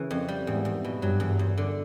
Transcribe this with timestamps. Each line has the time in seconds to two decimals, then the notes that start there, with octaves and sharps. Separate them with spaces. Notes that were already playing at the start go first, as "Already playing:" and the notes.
Already playing: C#3 E3
0.11 F2
0.28 G3
0.47 E2 G#2
0.65 E2
0.84 B2
1.02 G2 F#3
1.20 E2
1.39 E2
1.58 D3